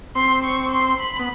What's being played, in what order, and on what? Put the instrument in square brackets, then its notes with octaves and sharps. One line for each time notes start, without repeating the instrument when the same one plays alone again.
[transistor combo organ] C4 [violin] C6
[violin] C#6
C6
B5
[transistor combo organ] B3